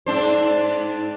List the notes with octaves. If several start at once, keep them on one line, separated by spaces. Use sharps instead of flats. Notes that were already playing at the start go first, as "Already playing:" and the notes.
G#2 D4 C5